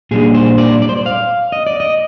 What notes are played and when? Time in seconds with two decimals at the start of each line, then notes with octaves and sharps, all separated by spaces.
0.11 A#2 G3 D4 G#4
0.34 C5
0.58 D5
0.82 D5
0.89 C5
0.97 D5
1.06 F5
1.52 D#5
1.67 D5
1.80 D#5